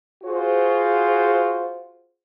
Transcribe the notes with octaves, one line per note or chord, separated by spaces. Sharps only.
F4 F#4 G#4 C5